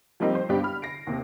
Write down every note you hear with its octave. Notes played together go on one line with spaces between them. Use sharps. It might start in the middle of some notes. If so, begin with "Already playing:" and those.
F3 G3 A#3 C4 D#4 G4
C5
G2 B3 D4 G4
B5 F6
A#6 C7 D7
D#2 C3